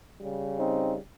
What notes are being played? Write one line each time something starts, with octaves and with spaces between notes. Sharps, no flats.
C#3 G3
C4 D#4